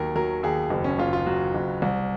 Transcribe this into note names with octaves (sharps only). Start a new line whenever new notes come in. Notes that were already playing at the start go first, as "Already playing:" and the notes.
Already playing: D#2 F#3 A#4
F#3 A#4
D#2 G#4
F#1
C#4
F#1 F4
F4
F#3 F#4
F#1
C2